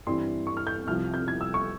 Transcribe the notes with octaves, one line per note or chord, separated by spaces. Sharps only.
G2 E3 G3 C4 E4 C6
C#6
F6
G6
C2 C3 F3 F6
G6
G#6
E6
C#6